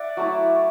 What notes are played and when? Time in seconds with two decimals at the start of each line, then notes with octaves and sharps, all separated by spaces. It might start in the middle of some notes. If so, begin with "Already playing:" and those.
Already playing: D5 E5 F#5
0.17 F#3 A3 E4